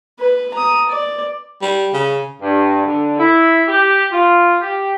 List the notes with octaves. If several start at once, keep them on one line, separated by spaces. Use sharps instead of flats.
B4
A#5 D#6
D5
G3
C#3
G2
D3
E4
G4
F4
G4